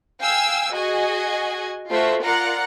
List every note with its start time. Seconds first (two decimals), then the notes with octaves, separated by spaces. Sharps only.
0.21 F5 G5 G#5 E6
0.74 F#4 G#4 D#5 G#5
1.89 A3 F4 F#4 C5 E5
2.23 F4 A#4 D5 F#5 A#5